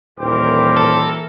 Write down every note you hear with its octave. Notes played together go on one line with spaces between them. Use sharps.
D#1 E3 A#3 A#4 C5 G5 D6
A4